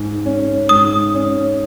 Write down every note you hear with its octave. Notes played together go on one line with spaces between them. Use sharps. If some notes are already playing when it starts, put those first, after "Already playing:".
Already playing: G#2
C#4
G#2 D#6
C#4